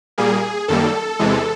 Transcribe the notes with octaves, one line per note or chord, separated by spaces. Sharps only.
A#2 G3 A#3 G#4
F#2 D#3 G3 A#3 A4
E2 C3 E3 G#3